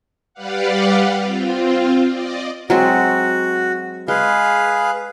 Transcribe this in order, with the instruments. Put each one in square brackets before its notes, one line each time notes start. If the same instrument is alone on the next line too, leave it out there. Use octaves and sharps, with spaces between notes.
[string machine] G3 G4 B4 D5 F5 F#5
C4 F4
D5 D#5
[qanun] F#3 G#3 C4 [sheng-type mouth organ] F#4
[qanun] G#3 [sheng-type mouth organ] G#4 B4 F5